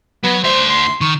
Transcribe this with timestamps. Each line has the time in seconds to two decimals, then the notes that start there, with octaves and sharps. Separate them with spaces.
0.23 F#3 B3
0.43 D2 C5 E5
0.70 C6
1.01 D#3 C#6